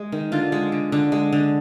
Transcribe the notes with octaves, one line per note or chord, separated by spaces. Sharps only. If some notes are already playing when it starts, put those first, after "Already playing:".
Already playing: G#3
D#3
D3 F4
G#3
D3
D3
G#3
D3